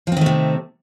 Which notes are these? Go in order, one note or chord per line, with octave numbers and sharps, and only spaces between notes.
C3 D#3 F3 A3 C4